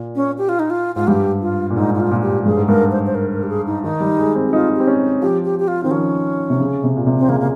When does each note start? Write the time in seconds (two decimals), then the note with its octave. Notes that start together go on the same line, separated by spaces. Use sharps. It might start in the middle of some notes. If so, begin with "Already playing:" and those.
Already playing: A#2
0.16 C#4
0.38 G4
0.49 F4
0.59 D#4
0.70 F4
0.96 G#2 F4
1.07 G2 G4
1.42 F4
1.70 A#2
1.76 G#2 D#4
1.94 D#4
2.00 F4
2.11 A#2
2.23 G4
2.45 G2 G#4
2.57 G#2
2.68 G2 A#4
2.92 C5
3.07 C5
3.15 A#4
3.32 A#4
3.43 G4
3.49 G#4
3.67 D#4
3.84 D#3 D#4
4.00 G3
4.19 G#3
4.36 C4
4.48 G4
4.53 D#4 F4
4.76 C4 G4
4.87 C#4
5.22 F3 G4
5.45 G4
5.59 G4
5.68 F4
5.84 D#3 C4
5.91 F3 C#4
6.50 C3
6.60 C#3
6.84 C3
6.96 A#2
7.07 C3
7.19 C4
7.29 C#3 A#3
7.40 A#3